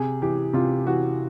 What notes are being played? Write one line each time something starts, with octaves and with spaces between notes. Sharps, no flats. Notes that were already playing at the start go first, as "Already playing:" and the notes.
Already playing: C3 G#4
E3 G4
C3 F4
E3 F#4